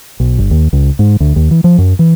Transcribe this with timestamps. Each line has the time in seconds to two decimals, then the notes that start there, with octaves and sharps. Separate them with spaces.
0.20 B1
0.38 G1
0.51 D#2
0.73 C#2
0.99 G#2
1.20 D2
1.36 D#2
1.51 E3
1.64 F3
1.78 F#2
1.99 E3